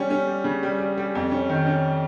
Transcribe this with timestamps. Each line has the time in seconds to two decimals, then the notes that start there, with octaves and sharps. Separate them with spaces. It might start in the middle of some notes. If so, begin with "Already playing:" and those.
Already playing: G3 C#4
0.10 C#4
0.27 G3
0.44 C#3
0.63 G3
0.80 G3
0.97 G3
1.15 F2
1.31 C#4
1.49 D#3
1.66 C#4